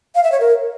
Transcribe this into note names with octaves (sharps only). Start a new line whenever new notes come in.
F5
E5
C#5
A#4